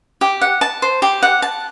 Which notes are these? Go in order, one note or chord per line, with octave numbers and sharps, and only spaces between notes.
G4
F#5
A5
C5
G4
F#5
A5